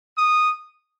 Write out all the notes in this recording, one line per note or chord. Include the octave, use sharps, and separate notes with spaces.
D#6